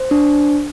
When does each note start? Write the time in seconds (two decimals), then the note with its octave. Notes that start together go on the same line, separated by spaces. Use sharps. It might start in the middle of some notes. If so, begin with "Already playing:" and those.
Already playing: C5
0.11 D4